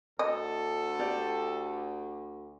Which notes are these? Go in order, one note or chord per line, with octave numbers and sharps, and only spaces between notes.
D2 A4 D#5
G4 D5